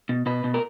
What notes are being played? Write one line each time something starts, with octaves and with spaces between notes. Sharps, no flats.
B2
B2 B4
B2
A#4